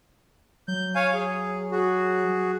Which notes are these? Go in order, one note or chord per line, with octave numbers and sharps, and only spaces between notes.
F#3 G6
C#5 F5 G#5
G#4
F#4 G#4